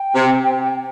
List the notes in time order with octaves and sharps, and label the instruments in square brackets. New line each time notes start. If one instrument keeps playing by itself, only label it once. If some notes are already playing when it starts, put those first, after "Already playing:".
Already playing: [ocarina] G5
[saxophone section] C3